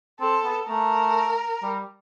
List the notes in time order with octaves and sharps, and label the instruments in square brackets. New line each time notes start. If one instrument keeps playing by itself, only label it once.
[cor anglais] C4 [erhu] A4
[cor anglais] B3
[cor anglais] A3 [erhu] A#4
[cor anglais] G3